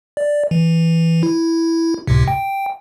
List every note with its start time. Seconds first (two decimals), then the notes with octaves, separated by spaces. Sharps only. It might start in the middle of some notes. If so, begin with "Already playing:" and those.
0.17 D5
0.51 E3
1.23 E4
2.07 C#2 A2 C3
2.28 G5